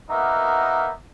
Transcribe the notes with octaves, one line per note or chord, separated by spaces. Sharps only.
A#3 B3 D#4 F#4 A#4 E5